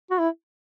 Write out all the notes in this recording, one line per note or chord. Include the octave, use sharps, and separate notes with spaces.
F#4
E4